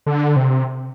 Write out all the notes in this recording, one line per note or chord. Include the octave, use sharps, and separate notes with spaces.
D3
C3